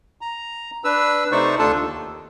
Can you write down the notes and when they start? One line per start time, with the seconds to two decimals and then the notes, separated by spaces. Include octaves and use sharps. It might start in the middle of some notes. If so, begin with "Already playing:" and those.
0.21 A#5
0.84 D4 B4 E6
1.32 C3 A3 D#4 C5 D5 C#6
1.59 D2 D4 F4 A4 A5
1.79 D#2